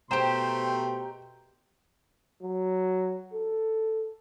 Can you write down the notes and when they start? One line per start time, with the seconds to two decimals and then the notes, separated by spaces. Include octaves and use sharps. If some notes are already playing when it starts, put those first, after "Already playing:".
0.11 B2 A3 G4 C5 G5 A#5 C6
2.43 F#3
3.33 A4